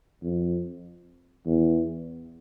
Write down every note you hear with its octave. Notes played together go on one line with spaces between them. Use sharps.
F2
E2